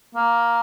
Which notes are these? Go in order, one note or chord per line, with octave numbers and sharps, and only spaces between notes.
A#3